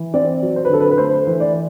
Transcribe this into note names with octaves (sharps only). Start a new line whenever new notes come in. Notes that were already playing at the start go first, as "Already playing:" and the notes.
Already playing: E3
C4 D5
F#3
C5
B4
D3 A4
B4
B4
A3 C5
E3
D5